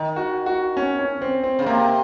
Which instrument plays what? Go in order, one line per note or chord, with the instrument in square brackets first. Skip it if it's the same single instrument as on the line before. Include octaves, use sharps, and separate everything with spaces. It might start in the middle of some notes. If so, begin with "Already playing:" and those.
Already playing: [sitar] D#3
[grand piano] F#4
F#4
C#4
C#4
C4
C4
[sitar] C#3
[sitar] C3 [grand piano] A#3